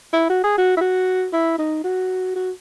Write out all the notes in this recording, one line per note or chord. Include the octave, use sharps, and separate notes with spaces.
E4
F#4
G#4
F#4
E4
F#4
E4
D#4
F#4
F#4